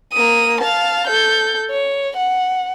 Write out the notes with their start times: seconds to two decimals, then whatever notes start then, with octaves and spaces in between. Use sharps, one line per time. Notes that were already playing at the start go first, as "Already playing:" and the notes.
0.13 A#3 D#6
0.61 F5 A5
1.07 A4 G6
1.71 C#5
2.17 F#5